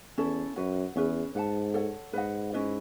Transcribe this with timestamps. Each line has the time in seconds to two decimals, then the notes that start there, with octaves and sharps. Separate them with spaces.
0.17 E2 C#4 E4 A4
0.56 F#2 F#4 B4 F#5
0.95 E2 C#4 G#4 B4
1.35 G#2 B4 F#5 A5
1.74 A4 C#5 F#5
2.13 G#2 B4 D#5 F#5
2.53 C#4 E4 B4 D#5